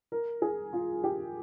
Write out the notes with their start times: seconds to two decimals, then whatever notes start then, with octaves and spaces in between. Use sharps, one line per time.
0.12 A#4
0.42 G#4
0.73 F4
1.04 G4